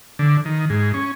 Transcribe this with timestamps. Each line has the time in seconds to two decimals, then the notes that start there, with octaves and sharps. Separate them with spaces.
0.19 D3
0.45 D#3
0.70 G#2
0.94 C#4